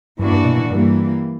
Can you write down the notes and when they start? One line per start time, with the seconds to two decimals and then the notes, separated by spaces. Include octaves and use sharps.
0.19 G2 E3 A#3 D4 F#4
0.32 G2
0.45 B2
0.58 A#2
0.70 G2 E3 G3 A#3